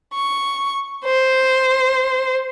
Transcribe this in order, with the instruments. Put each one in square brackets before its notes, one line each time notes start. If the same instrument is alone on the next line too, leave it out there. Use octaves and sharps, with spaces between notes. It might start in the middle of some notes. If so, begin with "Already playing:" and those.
[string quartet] C#6
C5